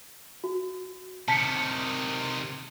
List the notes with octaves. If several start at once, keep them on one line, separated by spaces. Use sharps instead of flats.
F#4
C3 D#3 A5 B6 C#7